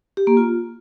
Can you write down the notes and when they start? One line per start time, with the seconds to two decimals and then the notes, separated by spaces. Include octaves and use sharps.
0.17 G4
0.27 A#3
0.37 F4